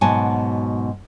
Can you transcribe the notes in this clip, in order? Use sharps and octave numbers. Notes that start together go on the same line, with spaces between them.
G#2 B2 F#3 F#5 G#5 A5